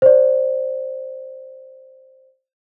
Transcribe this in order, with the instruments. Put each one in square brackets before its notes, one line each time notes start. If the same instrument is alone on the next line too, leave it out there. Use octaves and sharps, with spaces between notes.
[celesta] C5 D5